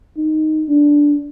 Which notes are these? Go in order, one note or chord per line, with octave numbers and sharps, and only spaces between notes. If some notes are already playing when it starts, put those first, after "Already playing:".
D#4
D4